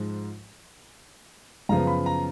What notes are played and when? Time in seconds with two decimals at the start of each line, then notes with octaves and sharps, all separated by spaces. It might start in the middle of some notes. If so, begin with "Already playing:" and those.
Already playing: G#2 F3 G#3
1.69 F#2 C#3 F3 B3 A#5
1.87 B5
2.06 A#5